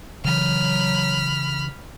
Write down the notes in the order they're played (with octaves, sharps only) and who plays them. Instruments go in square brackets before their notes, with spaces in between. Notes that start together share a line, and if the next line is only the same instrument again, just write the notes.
[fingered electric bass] C#3 E3 [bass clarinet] F#3 [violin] B5 F6